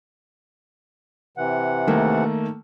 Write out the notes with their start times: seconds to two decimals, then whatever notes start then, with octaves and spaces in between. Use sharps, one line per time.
1.37 C3 E3 F#5
1.87 D#3 A3 A#3